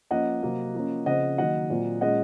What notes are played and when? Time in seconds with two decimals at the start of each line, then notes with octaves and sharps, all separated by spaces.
0.11 F3 A#3 C#4 D#5 F#5
0.42 C3 F#3 A#3
0.74 F3 A#3 C#4
1.06 C#3 F3 C4 D#5 F#5
1.38 D#3 F#3 A#3 D#5 F#5
1.70 A#2 F#3 C4
2.01 A#2 G#3 C#4 D#5 F#5